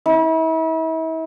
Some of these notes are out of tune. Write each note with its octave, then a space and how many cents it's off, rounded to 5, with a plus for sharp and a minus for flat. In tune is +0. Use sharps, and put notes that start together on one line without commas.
E4 -40